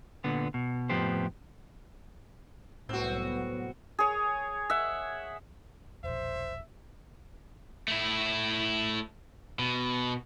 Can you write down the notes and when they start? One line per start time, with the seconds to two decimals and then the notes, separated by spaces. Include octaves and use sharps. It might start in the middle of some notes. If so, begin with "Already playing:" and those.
0.24 A#2 D3 B3
0.54 B2
0.89 F2 A2 F3 B3 G4 C5
2.89 C2 A2 F#3 B3 C4 F#4
3.99 G#4 C#5
4.70 E5 F#5
6.04 E1 A#1 C5 E5
7.88 A3 E4
9.59 B2